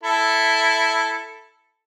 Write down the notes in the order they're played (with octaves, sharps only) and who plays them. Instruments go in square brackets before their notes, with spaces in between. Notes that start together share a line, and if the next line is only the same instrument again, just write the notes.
[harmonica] E4 A4